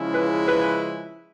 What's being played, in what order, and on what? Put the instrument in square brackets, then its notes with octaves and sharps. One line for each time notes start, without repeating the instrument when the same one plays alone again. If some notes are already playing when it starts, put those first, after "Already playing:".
Already playing: [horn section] C#3 F3 G#3 C#4 E4
[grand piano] B4
B4